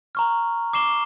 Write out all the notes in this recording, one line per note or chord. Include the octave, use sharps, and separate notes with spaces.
A#5 C#6 F6
D6 C7 E7 G7